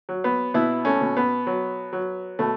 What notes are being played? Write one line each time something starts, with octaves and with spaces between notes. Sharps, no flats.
F#3
B3
B2 B3 E4
A3 C#4
B2
B3
F#3
F#3
B2 A3